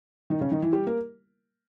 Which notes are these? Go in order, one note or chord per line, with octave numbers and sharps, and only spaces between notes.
D#3 D#4
C#3 C#4
D#3 D#4
E3 E4
G3 G4
A#3 A#4